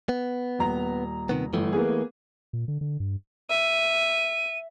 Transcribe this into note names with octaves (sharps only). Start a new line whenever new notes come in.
B3
D#1 A#5
C3 D#3 B3
G1 E3 A3
A#3 B3 G#4
A#2
D3
D3
G2
E5 D#7